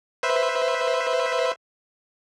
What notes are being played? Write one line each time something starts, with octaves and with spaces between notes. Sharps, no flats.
B4 C5 E5